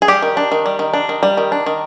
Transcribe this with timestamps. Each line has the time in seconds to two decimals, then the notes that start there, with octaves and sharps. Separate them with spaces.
0.02 G#4
0.08 G3 G4
0.22 D#3
0.37 D4
0.52 D#3
0.66 G3
0.79 D#3
0.94 D4
1.09 D#3
1.23 G3
1.37 D#3
1.52 D4
1.66 D#3